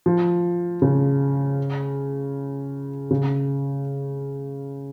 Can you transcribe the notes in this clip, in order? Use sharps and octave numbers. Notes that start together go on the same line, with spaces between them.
F3
C#3
C#3